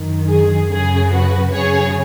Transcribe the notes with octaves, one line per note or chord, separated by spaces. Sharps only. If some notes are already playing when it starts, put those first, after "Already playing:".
Already playing: F#2 D#3
G#4
F#2 C#3 G#4
F#4 B4
F#2 C#3 G#4 C#5